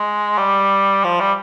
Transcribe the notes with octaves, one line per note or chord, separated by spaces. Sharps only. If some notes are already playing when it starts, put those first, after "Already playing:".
Already playing: G#3
G3
F3
G3